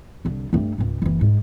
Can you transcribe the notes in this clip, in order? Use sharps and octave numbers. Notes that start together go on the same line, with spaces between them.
C2 D3
G2 A3
C#2 G#2
F#1 E3
G#2